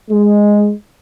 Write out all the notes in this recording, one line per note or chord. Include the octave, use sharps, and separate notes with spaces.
G#3